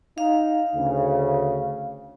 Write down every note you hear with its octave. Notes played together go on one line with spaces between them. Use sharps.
D#4 F5
D2 C#3